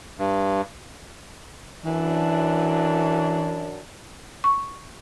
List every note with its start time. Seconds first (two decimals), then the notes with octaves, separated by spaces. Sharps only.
0.19 G2
1.85 F#2 E3 D4
4.44 C#6